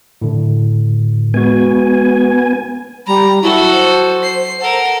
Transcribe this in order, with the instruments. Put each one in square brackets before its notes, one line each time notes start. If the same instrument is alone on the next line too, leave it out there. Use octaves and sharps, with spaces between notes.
[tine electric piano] A2 D3
[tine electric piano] G#3 F#4 [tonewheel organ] B3 G#5
[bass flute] G3 [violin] A#5 [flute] B5
[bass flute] F#3 [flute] E4 [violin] F#4 A4
[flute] C5
[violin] C7
[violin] A4 A#4 [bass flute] F#5